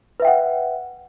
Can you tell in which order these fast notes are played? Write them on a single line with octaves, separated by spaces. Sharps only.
B4 E5 G5 F#5